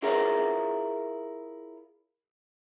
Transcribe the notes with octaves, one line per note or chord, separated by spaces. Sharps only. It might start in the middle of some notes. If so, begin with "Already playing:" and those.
E4 F4 G#4 A#4 C#5 F5